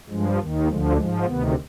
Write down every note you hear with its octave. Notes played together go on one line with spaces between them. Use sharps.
G2 F3 G#3
D#2 D#3
D2 D3 F3 G#3
G#2 F3 G#3
D2 C3 D#3 B3